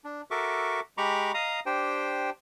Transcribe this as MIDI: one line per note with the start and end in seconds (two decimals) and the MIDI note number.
0.04 0.22 62
0.31 0.80 66
0.31 0.80 69
0.31 0.80 70
0.31 0.80 76
0.31 0.80 85
0.31 0.80 86
0.98 1.32 56
0.98 1.32 67
0.98 1.32 82
0.98 1.32 83
0.98 1.32 85
0.98 1.32 86
1.34 1.60 75
1.34 1.60 77
1.34 1.60 82
1.34 1.60 87
1.66 2.30 62
1.66 2.30 67
1.66 2.30 72
1.66 2.30 79